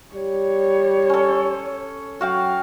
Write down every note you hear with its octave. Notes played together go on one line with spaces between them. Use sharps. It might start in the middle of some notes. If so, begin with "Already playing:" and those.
G3 C#5
C#4 A4
F#3 F#4 F5 G5